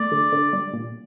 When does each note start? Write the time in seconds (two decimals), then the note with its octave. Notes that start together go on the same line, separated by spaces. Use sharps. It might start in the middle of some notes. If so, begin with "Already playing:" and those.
Already playing: A3 D5
0.11 D3
0.32 D3
0.53 G3
0.73 A#2